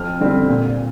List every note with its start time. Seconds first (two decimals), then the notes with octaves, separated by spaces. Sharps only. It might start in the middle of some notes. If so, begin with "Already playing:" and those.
Already playing: F2 F6
0.21 D3 G3 C4
0.49 A#2